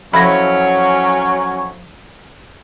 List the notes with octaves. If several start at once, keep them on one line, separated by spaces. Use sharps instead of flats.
F2 F#3 C#4 E4 C#5 B5 G#6 A#6